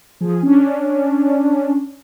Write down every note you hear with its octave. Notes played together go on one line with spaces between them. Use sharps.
F3 G#4
C#4 D4